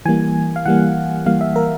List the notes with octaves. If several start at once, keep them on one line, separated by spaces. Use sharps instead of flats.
E3 G3 A#3 G#5
F5
E3 G3 A#3 F#5
E3 G3 A#3 F5
E5
A#4